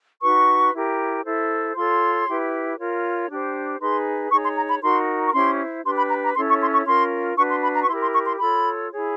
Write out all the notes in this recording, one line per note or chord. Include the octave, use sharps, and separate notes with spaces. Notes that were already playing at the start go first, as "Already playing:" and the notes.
D#4 F#4 B4 C#6
E4 G4 A#4
E4 A4 C5
F4 A4 C#5 C6
E4 G4 B4
F4 A#4 C#5
D4 G4 C5
D#4 G#4 B4 C6
D#4 G#4 C#5 C#6
C6
A#5
B5
D#4 F#4 A#4 C6
C#6
C#4 E4 G4 C5 C6
D4 G4 B4 C6
B5
A#5
A#5
C#4 E4 A4 C#5 C6
C#6
C6
C#6
C#4 F4 A#4 C6
D4 F#4 B4 C#6
C6
B5
A#5
C#6
E4 G4 A#4 C6
C6
C#6
C6
F4 A4 C#5 B5
E4 G#4 C#5